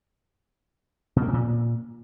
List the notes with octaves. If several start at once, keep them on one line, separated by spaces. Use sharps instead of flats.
B2
A#3
C3
A#2